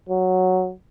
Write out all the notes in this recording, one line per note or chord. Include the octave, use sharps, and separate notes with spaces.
F#3